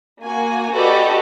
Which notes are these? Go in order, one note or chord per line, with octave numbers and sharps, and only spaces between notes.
A#3 F#4 G#5
F#4 G4 A4 B4 D5 D#5